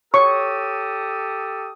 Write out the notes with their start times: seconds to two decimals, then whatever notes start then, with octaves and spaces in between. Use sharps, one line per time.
0.14 G4 A4 C#5 C#6 D#6